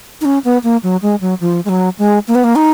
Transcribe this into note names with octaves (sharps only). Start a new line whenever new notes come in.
D#4
C#4
B3
A#3
F#3
G#3
F#3
F3
G#3
F#3
G#3
A#3
B3
A#3
D#4